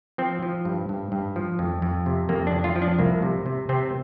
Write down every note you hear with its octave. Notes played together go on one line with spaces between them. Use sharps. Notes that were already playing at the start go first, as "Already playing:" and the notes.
F3 C4
F3
G2
G2
G2
F3
F2
F2
C3
F2 A#3
D4
F2
F4
F3
D4
C2 A#3
C3
C3
C3 C4